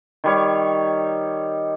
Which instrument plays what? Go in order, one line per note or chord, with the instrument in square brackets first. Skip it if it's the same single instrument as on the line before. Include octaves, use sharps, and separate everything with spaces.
[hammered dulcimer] D#3 G3 C#5